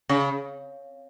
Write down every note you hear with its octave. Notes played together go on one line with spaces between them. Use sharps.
C#3